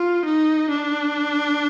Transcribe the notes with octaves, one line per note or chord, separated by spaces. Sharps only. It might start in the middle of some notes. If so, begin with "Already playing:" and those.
Already playing: F4
D#4
D4